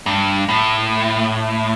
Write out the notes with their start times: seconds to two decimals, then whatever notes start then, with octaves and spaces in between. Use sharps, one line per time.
0.06 G2
0.49 A2